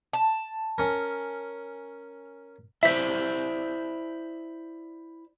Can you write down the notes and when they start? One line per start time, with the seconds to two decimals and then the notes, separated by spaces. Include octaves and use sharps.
0.13 A5
0.78 C#4 A#4
2.83 E4 C5 D5 E5 B6